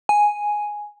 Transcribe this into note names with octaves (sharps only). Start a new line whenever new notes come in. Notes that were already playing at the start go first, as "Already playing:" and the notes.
G#5